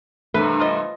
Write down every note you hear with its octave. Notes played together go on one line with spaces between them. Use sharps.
G2 C3 E3 A3 B4
F3 F4 D#5